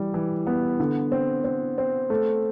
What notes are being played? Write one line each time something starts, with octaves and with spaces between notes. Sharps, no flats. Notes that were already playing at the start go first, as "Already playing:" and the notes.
Already playing: E3 G3
E3
B3
D3
C4
C4
C4
A3